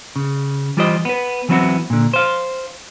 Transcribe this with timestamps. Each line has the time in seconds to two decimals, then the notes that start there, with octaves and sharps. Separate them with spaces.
0.16 C#3
0.77 E3 G3 F4 G4 C5 D#5
1.05 B3 B4
1.49 E3 F#3 B3 C4 E4 F#4
1.90 A#2 D3
2.13 C5 F5